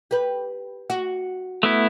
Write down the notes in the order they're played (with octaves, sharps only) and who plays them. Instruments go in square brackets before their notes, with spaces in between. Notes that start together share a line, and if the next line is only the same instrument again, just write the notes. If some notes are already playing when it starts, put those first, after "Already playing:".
[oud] G4 B4
F#4
[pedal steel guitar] A3 B3 E4